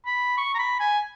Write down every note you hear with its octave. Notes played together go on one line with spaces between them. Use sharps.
B5
C#6
A#5
B5
G#5